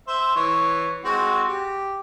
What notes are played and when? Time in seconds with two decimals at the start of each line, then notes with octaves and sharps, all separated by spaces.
0.08 C5 E5
0.36 E3 C#5
1.04 G#3 C4 F#4
1.48 G4